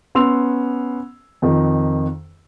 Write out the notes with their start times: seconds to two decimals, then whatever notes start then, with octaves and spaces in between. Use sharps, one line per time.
0.15 B3 C#4 C6 E6 F7
1.42 F2 D#3